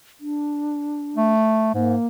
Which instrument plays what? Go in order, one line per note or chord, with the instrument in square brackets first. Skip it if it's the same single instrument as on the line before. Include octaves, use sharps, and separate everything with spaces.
[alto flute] D4
[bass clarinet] A3
[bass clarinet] G#2 [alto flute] A#3